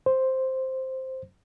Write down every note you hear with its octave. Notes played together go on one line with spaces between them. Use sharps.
C5